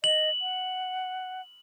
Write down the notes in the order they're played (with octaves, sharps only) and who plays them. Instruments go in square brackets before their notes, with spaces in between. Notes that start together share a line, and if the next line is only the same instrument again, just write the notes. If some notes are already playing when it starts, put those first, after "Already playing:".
[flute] D#5 [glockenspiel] F#7
[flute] F#5